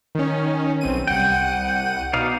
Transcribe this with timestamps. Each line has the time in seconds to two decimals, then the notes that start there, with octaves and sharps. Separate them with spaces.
0.15 D#3 C#4
0.81 B1 C4 D#7
1.07 C2 F#5 G5 D#7
2.13 B2 D#4 D5 F5